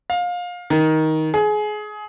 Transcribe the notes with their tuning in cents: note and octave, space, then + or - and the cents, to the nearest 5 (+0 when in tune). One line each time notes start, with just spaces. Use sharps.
F5 +25
D#3 +15
G#4 +25